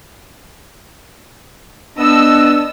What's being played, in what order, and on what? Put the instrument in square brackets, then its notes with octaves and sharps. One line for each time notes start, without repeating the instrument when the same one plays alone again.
[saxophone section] B3 [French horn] D4 [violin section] D#5 A5 E6